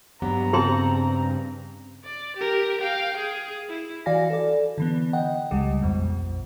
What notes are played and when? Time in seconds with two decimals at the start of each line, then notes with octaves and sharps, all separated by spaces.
0.22 G2 F#3 B3 G4 A#5
0.53 C#3 C4 G#4 A5 C6
2.04 D5
2.37 G4 A#4
2.81 F5 G5
3.17 G#4
3.69 E4
4.06 E3 F#4 D5 F5 G#5 A#6
4.30 A4 D5
4.78 D3 E3 B3
5.13 D#5 F#5 G5
5.51 C#2 C#3 G3 G#3
5.83 A#1 F2 B2